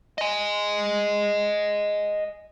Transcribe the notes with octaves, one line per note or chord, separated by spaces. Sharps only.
D#5 G#5